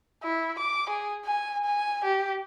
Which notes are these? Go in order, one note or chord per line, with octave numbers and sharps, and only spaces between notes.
E4
D6
G#4
G#5
G#5
G4